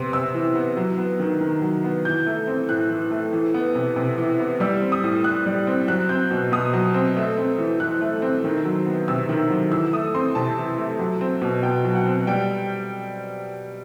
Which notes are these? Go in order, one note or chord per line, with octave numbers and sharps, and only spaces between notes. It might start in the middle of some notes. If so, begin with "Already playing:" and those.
Already playing: C3 B3 C6
C3 E6
E3
B3
F#3
B3
D#3
D#3
F#3
B3
E3 G6
A3
C4
A2 F#6
E3
A3
E3
B3
C3
C3
E3
B3
G3 E6
C4
D#6
A2
A2 F#6
G3
C4
F#3 F#6
C4 G6
B2
B2 D#6
F#3
C4
A3
C4
E3
E3 F#6
A3
C4
D#3
F#3
B3
C3 E6
D#3
F#3
E3 E6
A3 D#6
C4 C6
C3 A5
E3
A3
F#3
C4
B2
B2 G5
F#3
F#5
C4
G3 G5